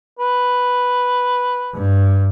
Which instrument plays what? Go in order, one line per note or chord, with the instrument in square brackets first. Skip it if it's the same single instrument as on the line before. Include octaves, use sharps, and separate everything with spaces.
[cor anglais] B4
[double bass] G2